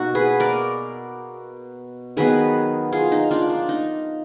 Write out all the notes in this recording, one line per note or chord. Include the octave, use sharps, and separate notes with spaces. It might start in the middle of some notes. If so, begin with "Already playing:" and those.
Already playing: B2 A#3 D#4 F#4
G#4 B4
A#4 D5
D#3 F#3 B3 G#4 B4
F4 G#4
D#4
D4 F4
D4
D#4